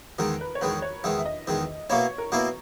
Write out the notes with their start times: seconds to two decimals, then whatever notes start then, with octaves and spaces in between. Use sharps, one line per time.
0.19 E2 D#3 G#3 A#4
0.41 B4
0.55 C#5
0.61 E2 D#3 G#3 B4
0.82 C#5
1.04 E2 D#3 G#3 E5
1.18 E5
1.26 D#5
1.47 E2 D#3 G#3
1.90 B2 A#3 E4 C#5
2.18 A#4
2.32 B2 A#3 E4 A#4